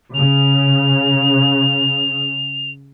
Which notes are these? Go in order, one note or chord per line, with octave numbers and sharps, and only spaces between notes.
C#3 F7